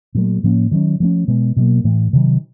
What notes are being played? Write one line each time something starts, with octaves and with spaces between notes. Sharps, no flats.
A#2 F#3 A3
A2 F3 A#3 C#4
D#3 F#3 A#3 C#4
F3 A3 C#4
B2 G#3 B3
B2 F#3 A#3
A2 E3 A3
C3 D#3 F#3